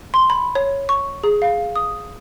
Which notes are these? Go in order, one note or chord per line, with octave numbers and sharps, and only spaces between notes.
C6
B5
C#5
C#6
G#4
F5
D#6